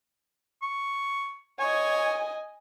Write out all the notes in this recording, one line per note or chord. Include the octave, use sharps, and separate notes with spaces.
C#6
C#5 D#5 G#5